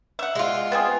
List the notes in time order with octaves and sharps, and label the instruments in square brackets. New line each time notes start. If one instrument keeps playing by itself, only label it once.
[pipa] E5 F#5
[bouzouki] G#3 F4
[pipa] B3 C4 G#4